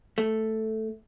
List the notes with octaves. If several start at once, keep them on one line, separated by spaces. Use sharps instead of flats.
A3